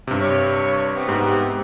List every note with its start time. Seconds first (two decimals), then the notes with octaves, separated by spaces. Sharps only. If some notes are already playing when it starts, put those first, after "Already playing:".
0.07 G2 C3
0.20 C#5
0.95 C3 B3 C4
1.08 G#2 G4